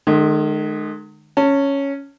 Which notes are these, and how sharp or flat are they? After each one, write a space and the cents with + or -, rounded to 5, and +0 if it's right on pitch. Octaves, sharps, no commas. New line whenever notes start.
D#3 -40 G#3 +25
C#4 +0 A5 +25